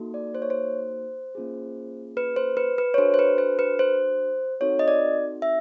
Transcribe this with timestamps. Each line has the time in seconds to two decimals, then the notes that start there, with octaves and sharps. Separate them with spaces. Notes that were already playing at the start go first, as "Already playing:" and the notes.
Already playing: A#3 D#4 F#4 A4
0.14 D5
0.35 C5
0.42 C#5
0.50 C5
1.35 A#3 C#4 F4 G#4
2.17 B4
2.36 C5
2.57 B4
2.78 B4
2.94 C#5
2.98 D4 F#4 A4 C5
3.14 C5
3.19 B4
3.38 C5
3.59 B4
3.79 C5
4.60 C4 D#4 F#4 A4 C#5
4.79 D#5
4.88 D5
5.42 E5